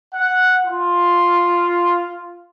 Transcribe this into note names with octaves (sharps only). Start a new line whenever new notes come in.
F#5
F4